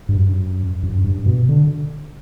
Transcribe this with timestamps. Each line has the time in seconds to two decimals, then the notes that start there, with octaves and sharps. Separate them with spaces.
0.09 G2
0.17 F#2
0.83 F#2
1.04 G2
1.26 B2
1.49 D3